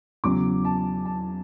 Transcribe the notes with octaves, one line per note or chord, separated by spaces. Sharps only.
E2 C#3 F#3 D6
A5
A5